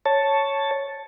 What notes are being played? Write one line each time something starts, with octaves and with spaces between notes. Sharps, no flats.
C#5 A5